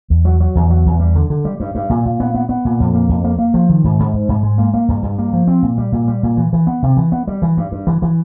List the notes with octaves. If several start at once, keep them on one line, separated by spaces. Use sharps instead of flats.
E2
F#3
F#3
E2
F#3
E2
G3
D3
D3
G3
G2
G2
A#2
A#2
B3
B3
B3
A#2
F2
A#3
F2
A#3
A#3
F3
D#3
G#2
G#2
G#2
G#2
G#3
A#3
A#3
G2
G2
A#3
F3
C4
A#2
G3
A#2
G3
A#2
E3
E3
B3
C3
E3
B3
G3
E3
G2
G2
E3
E3